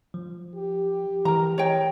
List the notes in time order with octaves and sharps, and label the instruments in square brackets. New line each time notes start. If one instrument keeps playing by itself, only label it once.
[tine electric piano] F3
[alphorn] G4
[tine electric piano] E3 [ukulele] A#4 A#5
[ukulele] C#5 D#5 G5